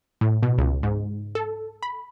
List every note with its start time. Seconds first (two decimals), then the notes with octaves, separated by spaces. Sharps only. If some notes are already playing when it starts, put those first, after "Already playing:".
0.21 A2
0.43 B2
0.58 C#2
0.83 G#2
1.35 A4
1.83 B5